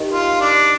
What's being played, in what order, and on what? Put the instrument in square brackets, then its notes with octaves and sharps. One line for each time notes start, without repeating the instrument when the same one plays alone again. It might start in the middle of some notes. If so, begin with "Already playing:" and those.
Already playing: [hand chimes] D#4 G4 A#4 D#5
[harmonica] F4
D4